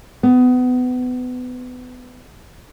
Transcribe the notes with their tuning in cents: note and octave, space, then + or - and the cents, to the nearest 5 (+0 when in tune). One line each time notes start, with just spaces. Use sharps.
B3 +25